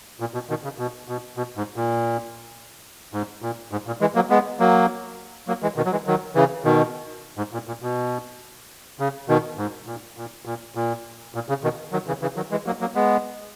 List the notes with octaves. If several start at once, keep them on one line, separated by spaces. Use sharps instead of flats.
A#2
B2
B2 D#3
C#3
B2
B2
B2
G#2
A#2
G#2
A#2
G#2
A#2
E3 G#3
F#3 A#3
G#3 B3
F#3 A#3
F#3 A#3
E3 G#3
B2 D#3
F#3
E3 G#3
D#3 F#3
C#3 E3
B2 D#3
G#2
A#2
A#2
B2
C#3
B2 D#3
G#2
A#2
A#2
A#2
A#2
A#2
C#3
B2 D#3
D#3 F#3
C#3 E3
C#3 E3
D#3 F#3
E3 G#3
F#3 A#3
F#3 A#3
G#3 B3